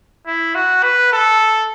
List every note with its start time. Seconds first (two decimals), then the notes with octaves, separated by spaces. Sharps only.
0.27 E4
0.55 F#4
0.83 B4
1.13 A4